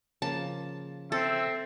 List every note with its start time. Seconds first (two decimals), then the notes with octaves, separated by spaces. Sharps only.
0.22 C#3 F3 A#3 A5
1.12 C4 A4 E5